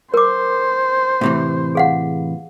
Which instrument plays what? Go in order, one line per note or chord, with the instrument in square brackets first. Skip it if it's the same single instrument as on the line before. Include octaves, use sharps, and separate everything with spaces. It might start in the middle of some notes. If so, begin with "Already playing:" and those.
[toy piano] A#4 D6 [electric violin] C5
[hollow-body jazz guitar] A2 C3 E3
[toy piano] G#4 F5 F#5